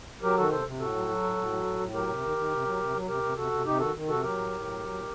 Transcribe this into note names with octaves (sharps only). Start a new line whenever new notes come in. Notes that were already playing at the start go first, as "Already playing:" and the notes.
F#3 G4 A#4
D#3 F#4 A4
C3 A4 C5
C3
A2 F#4 A4
F#3
F#3
A2
A2
F#3
A2
A2
F#3 G4 A#4
C3
D#3
D#3
C3
F#3
C3
F#3
C3 G4 A#4
C3
C3 F#4 A4
C3
C3 D#4 G4
D#3 F#4 A4
D#3
C3 F#4 A4
F#3 G4 A#4
A2
A2
F#3
F#3
A#2